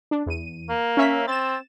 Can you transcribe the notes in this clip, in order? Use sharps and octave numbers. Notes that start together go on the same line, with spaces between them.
D4
E2 D#7
A#3
C#4 E5 B6
C4 A6 E7